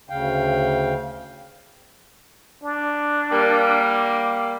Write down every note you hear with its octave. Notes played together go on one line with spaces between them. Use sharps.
D2 C#3 F5 G5
D4
G3 A#3